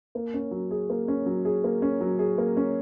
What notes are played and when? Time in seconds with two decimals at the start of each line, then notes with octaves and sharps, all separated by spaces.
0.15 A#3
0.34 C#4
0.51 F#3
0.71 G#4
0.90 A#3
1.08 C#4
1.26 F#3
1.45 G#4
1.64 A#3
1.82 C#4
2.01 F#3
2.19 G#4
2.38 A#3
2.57 C#4